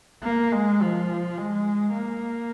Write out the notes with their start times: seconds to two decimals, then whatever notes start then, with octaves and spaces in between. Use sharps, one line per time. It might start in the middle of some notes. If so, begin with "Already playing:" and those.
0.24 A#3
0.53 G#3
0.81 F3
1.38 G#3
1.94 A#3